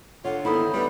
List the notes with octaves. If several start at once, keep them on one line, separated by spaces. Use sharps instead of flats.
D3 F4 C#5 F#5
D#3 A#3 B3 E4 A4 C5 B5 D#6
D3 G3 B4